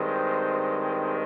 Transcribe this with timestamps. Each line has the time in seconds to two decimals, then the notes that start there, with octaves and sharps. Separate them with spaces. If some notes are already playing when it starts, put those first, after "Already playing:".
Already playing: G2 D#3 G#3 C4
0.14 C5